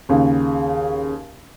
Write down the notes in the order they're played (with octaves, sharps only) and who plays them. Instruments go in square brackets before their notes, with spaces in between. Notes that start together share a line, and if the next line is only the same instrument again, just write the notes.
[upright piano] D#2 C#3